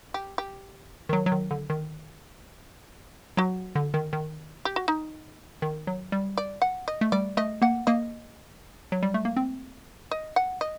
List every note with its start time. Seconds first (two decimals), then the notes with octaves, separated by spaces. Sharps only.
0.14 G4
0.38 G4
1.09 D#3
1.13 F#3
1.26 F#3
1.32 D#3
1.51 D3
1.70 D#3
3.37 F#3 F#4
3.75 D3
3.94 D#3
4.13 D#3
4.65 G4
4.76 F#4
4.88 D#4
5.62 D#3
5.87 F#3
6.12 G3
6.37 D5
6.62 F#5
6.88 D#5
7.01 A3
7.12 G3 D5
7.37 A3 D#5
7.62 A#3 F#5
7.87 A#3 D#5
8.92 F#3
9.03 G3
9.14 A3
9.25 A#3
9.37 C4
10.11 D#5
10.36 F#5
10.61 D#5